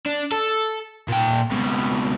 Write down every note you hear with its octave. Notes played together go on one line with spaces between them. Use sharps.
D4
A4
A#2 G5
C#2 B2